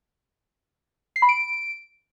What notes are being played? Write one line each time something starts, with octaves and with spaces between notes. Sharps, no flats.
C7
B5
D7